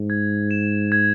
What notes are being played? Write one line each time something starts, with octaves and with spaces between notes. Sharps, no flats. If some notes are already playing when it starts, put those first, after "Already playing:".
Already playing: G#2
G#6
E7
G#6